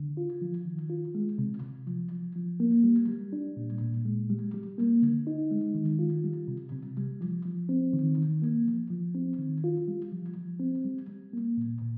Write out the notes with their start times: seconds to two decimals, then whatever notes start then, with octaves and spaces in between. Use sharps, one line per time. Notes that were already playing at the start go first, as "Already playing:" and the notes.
Already playing: D3
0.17 F4
0.42 F3
0.65 D#3
0.90 F4
1.15 G#3
1.38 C3
1.62 C3
1.87 F3
2.12 F3
2.35 F3
2.60 A#3
2.84 G3
3.09 G3
3.33 D4
3.57 A#2
3.81 A#2
4.05 G#3
4.30 G3
4.54 G3
4.78 A#3
5.02 D3
5.27 D#4
5.51 G#3
5.75 D#3
5.99 F4
6.24 G3
6.48 C3
6.72 C3
6.97 G3
7.21 F3
7.46 F3
7.69 C4
7.93 D#3
8.18 D#3
8.42 A#3
8.66 F3
8.90 F3
9.15 C4
9.39 D#3
9.64 F4
9.88 G3
10.12 F3
10.37 F3
10.60 C4
10.84 G3
11.09 G3
11.33 A#3
11.57 A#2
11.81 A#2